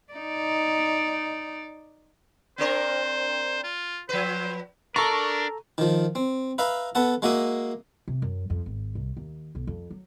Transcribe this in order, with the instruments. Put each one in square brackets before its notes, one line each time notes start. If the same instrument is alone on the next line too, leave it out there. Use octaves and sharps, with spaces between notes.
[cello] D#4 D5
[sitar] C4 D4 A#4 [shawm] C5
[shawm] F4
[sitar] F3 B4 [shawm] C5
[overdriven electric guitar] D4 [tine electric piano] A4 A#5 [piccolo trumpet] A#4 [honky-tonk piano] C#6
[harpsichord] D#3 F3
C4
B4 E5 F5 A#5 B5
B3 A4 F#5 A5
G#3 A#3 F#4 E5 D#6
[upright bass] C3
F#2
F2
G#1
C2
D#2
B1
F2
F#3